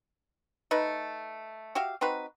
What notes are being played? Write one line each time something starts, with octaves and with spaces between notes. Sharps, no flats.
A3 D#4 B4
F#4 G4 E5 F5
C4 D#4 F#4 B4